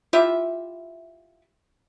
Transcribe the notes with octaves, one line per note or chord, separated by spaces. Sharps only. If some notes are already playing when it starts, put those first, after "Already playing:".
E4 F4 G4 E5